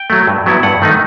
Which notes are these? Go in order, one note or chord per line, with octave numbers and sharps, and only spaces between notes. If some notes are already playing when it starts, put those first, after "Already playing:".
Already playing: G5
F#3 A3
G2
F#3 B3 E4
G2 F#5
D#3 A3 D#4